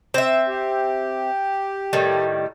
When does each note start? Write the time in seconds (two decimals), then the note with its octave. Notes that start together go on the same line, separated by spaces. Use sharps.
0.14 C4 E5
0.47 G4
1.93 A2 D#3 G3